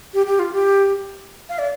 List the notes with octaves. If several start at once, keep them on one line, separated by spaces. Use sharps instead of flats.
G4
G4
F4
G4
F5
D5